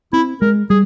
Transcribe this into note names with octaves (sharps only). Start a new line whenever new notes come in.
C4 E4
G#3 A#4
G3 G#4